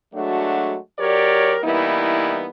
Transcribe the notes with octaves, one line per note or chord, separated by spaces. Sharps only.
F#3 G#3 A3 D4 F#4
F#3 G4 A#4 C#5 D5
E3 G3 A#3 B3 D#4 E4